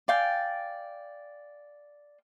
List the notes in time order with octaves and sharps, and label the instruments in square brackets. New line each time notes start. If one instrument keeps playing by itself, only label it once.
[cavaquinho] D5 F5 G5 G#5